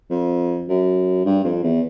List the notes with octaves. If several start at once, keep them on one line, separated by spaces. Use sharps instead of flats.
F2
F#2
G2
F2
E2